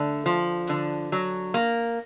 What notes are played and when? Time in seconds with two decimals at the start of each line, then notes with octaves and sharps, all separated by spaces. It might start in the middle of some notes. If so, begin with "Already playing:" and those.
Already playing: D3 A3
0.26 F3
0.69 D3
1.12 F#3
1.54 A#3